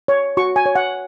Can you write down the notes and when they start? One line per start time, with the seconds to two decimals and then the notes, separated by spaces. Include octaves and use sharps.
0.08 C#5
0.37 F#4 C#6
0.56 G#5
0.66 C#5
0.75 F#5